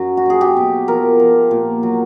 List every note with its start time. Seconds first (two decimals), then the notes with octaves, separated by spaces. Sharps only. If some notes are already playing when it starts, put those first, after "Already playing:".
Already playing: F#2 F#3
0.17 F#4
0.26 F#3 G#4
0.41 G4
0.56 B2
0.88 F3 A#4
1.20 F3
1.51 A#2
1.83 F#3